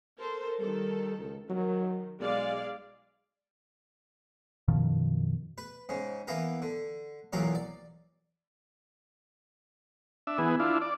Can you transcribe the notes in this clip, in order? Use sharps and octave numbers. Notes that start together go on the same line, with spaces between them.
A4 A#4 C5
D#3 G3 A4
C#2
D#3 F#3
B1 G#3 D5 F5
F#2 B2 D#3 F3
B4
G#2 C#3
E3 A#3 B3 A#4
D3
B1 E2 A#2 F#3 A#3 A#4
D5
D4 E5
E3 B3 G#4
D4 E4 F4
D5